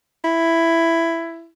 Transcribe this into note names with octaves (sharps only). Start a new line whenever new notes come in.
E4